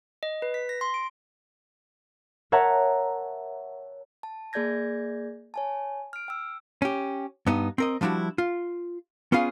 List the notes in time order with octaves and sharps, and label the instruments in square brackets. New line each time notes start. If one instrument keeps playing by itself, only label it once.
[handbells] D#5
B4
B6
A#6
C6
D7
[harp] A#4 C#5 E5 F#5 A5 A#5
[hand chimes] A5
A#3 G#4 D5 G6 G#6 A#6
C#5 G#5 A5
F6 D7
G5 E6
[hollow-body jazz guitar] C#4 G4
G2 B3 D#4
C4 A#4 D#5
F3 G3 D4 E4 F#4
F4
B3 C#4 F4 G#4 F5